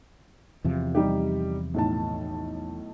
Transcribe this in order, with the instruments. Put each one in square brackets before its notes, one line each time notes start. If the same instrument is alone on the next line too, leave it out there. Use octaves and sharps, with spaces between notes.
[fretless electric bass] E2 C3 F3
[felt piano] G3 D#4 G4
B1 A2 A5